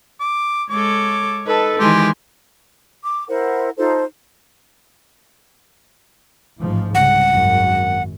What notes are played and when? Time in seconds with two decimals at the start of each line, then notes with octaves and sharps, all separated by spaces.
0.20 D6
0.70 G#3 A4 C#5 D6
1.47 D#4 A4 B4
1.80 D#3 E3 G#3 G4 G#5 C6
3.04 D6
3.28 E4 A#4 C5 F#5
3.77 D#4 F4 A4 C5
6.60 A1 G#2 F3
6.95 C2 C#3 F#5
7.31 G#1 F#2